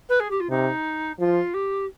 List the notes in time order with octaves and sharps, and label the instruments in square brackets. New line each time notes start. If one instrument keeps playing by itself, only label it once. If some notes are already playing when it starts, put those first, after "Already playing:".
[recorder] B4
G#4
G4
F4
[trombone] C3 [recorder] D#4
[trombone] F3 [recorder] F4
[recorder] G4